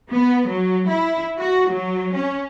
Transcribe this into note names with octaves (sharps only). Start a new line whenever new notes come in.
B3
F#3
E4
F#4
F#3
C#4